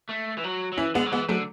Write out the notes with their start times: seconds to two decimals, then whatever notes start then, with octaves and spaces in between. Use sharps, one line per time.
0.09 A3
0.38 E3
0.44 F#3
0.72 F#3
0.77 E3 C#4 E4
0.95 D3 G#3 B3
1.06 F#3
1.12 E3 G#3 B3
1.29 D3 F#3 A3